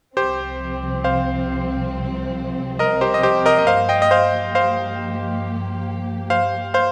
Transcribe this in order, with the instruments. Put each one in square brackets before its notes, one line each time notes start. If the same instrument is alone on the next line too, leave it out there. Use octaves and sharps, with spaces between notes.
[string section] C2 C3 F3 C4 [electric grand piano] G4 C5
[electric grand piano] C5 F5
A#4 D#5
G4 C5
D#5
G4 C5
A#4 D#5
D#5
[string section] G2 F3 A#3 G4 [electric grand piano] C5 F5
[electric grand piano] D#5 G5
D#5
C5 F5
C5 F5
C5 F5
C5 F5